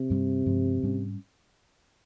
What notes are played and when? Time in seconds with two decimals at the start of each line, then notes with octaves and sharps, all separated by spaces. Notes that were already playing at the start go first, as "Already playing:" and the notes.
Already playing: C3
0.10 G2 G3 C4
0.46 G2 F3 G#3
0.83 G#2 G3 C#4